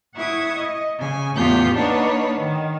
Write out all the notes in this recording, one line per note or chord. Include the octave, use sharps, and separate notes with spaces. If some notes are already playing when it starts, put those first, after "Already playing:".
E4 F#5 C#6 D#6 G#6
D#5
C#3 G#5
E2 A2 B3 F4 G4 G6
A#3 D4 D#4 B4 C#5 F#5
D#3